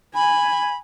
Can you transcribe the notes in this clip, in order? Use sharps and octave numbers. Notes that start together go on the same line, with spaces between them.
G#5 B5